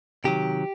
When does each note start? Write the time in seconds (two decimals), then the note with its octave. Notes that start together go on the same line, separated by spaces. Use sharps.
0.24 C3 D#3 F#3 G4